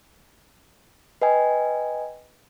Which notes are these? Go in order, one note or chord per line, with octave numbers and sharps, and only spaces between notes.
B4 D#5 G5 G#5